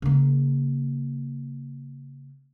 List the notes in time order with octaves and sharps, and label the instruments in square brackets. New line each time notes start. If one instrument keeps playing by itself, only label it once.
[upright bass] C#3 A#3